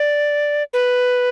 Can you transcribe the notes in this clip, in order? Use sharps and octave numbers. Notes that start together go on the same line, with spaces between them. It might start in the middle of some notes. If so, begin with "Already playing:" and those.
Already playing: D5
B4